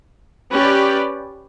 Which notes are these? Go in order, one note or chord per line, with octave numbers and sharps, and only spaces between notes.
C#4 G4 B4 D5